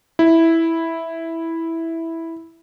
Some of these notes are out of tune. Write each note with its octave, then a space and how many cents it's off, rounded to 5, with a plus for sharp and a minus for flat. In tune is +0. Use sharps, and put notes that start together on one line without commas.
E4 -5